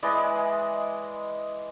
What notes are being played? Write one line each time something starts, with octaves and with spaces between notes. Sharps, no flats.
E3 G#3 D5 D#5